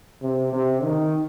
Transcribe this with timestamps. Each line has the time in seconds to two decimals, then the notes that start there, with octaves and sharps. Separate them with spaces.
0.22 C3
0.53 C3
0.83 D#3